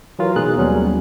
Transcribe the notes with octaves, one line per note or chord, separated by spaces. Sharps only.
E3 F#3 F4 A#4
B2 G#3 D#4 G#4 F#6
D#2 F#3 G3 B3 C#4